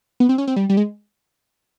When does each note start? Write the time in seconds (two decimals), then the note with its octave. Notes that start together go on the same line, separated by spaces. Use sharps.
0.20 B3
0.29 C4
0.38 C#4
0.47 C4
0.56 G3
0.69 G3
0.77 G#3